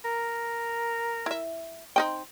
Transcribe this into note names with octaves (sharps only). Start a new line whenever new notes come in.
A#4
E4 E5
C4 D#4 G5